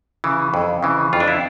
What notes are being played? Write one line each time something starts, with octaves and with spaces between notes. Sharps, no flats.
C#3 E3
F2
C#3 E3
F2 F4
D4
E4